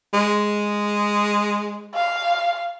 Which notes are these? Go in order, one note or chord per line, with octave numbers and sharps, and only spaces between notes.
G#3
F5